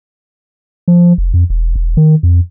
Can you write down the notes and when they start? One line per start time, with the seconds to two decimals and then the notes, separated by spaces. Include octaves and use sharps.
0.88 F3
1.18 F1
1.34 F2
1.50 E1
1.76 E1
1.97 D#3
2.23 F2